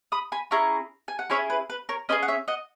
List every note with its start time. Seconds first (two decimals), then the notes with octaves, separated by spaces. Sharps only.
0.12 B5 D#6
0.32 G#5 B5
0.51 C#4 E4 G#4 A#5 C#6
1.08 G#5
1.19 F#5
1.30 C#4 E4 G#4 C#5 E5
1.50 B4
1.70 B4
1.89 A#4 C#5
2.09 C#4 E4 G#4 B4 D#5
2.23 F#5
2.28 C#5 E5
2.48 D#5 F#5